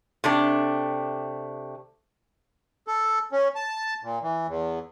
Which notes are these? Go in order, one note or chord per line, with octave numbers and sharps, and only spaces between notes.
C3 A3 D4
A4
C#4
A5
A#2
E3
E2